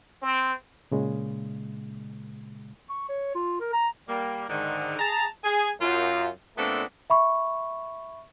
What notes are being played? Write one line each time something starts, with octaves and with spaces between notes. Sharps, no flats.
C4
A#2 C#3 G#3
C#6
C#5
F4
A#4
A#5
G3 A#3
G#2 D3 D#3
G#4 A5 A#5
G#4 G#5
F#2 F4
A#2 A3 B3 C4 D4 A4
E5 B5 C#6